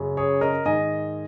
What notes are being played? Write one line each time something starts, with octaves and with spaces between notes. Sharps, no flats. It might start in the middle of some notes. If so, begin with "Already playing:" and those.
Already playing: F#2 C#3
G#4 C#5
A#4 D#5
G#2 D#3 D#5 G#5